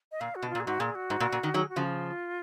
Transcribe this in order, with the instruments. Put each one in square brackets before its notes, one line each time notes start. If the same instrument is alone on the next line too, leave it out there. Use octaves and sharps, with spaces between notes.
[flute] D#5
[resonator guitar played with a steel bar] A#2 [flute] F5
[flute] F#4
[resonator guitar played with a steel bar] B2
[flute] F4
[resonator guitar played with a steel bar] A#2
[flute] G#4
[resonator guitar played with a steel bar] G#2 [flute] F#4
[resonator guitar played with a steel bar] A#2 [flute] G#4
[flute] F#4
[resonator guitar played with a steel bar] G#2
A#2
A#2
D#3
[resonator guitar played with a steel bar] D#3 F#3 [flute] G#4
[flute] F#4
[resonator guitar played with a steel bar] C#3 F3
[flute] F4